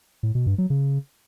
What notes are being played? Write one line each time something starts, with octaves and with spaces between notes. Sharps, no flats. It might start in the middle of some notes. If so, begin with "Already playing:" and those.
A2
B2
G2
F#3
C#3